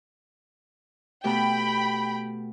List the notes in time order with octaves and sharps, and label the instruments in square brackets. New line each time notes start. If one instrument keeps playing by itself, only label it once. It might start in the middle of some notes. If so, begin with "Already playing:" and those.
[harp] B2 A3 G4 [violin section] G5 B5